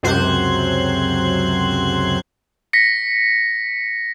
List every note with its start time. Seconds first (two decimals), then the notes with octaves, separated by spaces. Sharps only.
0.03 C#2 F#2 C3 C5 F#6 G#6
2.73 A#6 B6 C#7